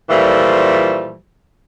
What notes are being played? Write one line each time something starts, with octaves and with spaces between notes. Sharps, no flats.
A#2 E3 F3 G3 A3